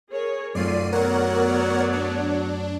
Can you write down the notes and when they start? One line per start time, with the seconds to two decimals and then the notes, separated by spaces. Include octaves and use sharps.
0.11 G#4 A#4 C#5
0.55 F#2 A3 C4 F4 D5 C7 D#7
0.92 F#3 B3 A#4 C#5 D5 F#5
1.92 D4